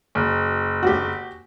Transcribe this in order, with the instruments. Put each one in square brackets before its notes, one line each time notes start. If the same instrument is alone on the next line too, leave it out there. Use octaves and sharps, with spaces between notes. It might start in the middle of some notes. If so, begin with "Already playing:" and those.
[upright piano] F#1
[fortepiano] F#4 G4